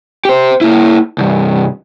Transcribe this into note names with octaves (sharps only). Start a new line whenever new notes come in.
G4 C5
A#3 E4
C2 G2